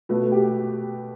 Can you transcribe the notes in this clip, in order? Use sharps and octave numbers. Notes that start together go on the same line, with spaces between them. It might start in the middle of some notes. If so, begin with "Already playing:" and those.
B2 A3 B4
G4